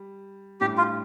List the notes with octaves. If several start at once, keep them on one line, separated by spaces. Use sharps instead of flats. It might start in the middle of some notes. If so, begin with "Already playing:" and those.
Already playing: G3
A2 G3 D4 G4
F4